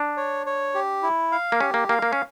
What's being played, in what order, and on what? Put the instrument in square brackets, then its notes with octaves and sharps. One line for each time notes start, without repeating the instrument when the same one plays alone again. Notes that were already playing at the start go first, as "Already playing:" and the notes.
Already playing: [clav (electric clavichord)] D4
[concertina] C#5
C#5
G4
E4
F5
[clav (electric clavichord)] A#3
[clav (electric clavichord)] C#4 [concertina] G4
[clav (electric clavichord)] A#3
[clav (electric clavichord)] A#3 [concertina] F5
[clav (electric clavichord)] A#3
C#4